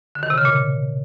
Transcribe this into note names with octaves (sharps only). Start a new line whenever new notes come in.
D3
D#3
C3
C#3
A#2